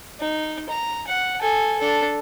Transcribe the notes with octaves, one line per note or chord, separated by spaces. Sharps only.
D#4
A#5
F#5
A4 G#5
D4 A4